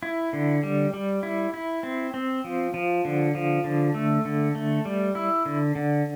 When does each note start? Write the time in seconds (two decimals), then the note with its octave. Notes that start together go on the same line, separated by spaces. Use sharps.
0.03 E4
0.33 D3
0.63 G3
0.94 G3
1.23 E4
1.54 E4
1.83 C4
2.14 C4
2.44 F3
2.74 F3
3.05 D3
3.35 F3
3.64 D3
3.94 A3
4.25 D3
4.55 A3
4.85 G3
5.15 E4
5.46 D3
5.75 D3